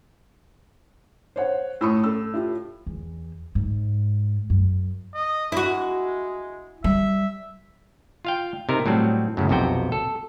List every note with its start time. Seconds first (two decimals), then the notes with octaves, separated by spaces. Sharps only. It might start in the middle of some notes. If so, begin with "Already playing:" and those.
1.36 C5 C#5 F#5
1.81 A2 C#6 D#6 E6
2.03 A4 E6
2.34 E4 F4 G4
2.87 E2
3.55 G#2
4.50 F#2
5.14 D#5
5.52 G#3 E4 F#4
6.84 G3 E5
8.25 F4 F5 G5
8.69 C3 D#4 A#4
8.86 A2 F#3 G3 C4
9.37 F#2 A2 C#3
9.49 B1 F2 C3 F#4 G5
9.92 A4